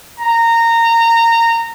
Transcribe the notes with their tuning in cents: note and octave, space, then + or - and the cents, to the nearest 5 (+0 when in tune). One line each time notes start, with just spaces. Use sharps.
A#5 -20